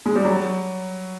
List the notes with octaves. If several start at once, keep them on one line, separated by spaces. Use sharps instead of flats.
G#3
G3
F#3